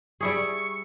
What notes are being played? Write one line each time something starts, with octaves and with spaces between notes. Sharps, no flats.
G3 E4 G#4 C#6